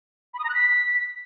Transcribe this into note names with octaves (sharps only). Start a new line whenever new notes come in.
B5
D#6
A#5
F#6
B6